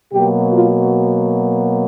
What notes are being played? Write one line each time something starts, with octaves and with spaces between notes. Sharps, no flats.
B2 F#3 A#3 G4
F4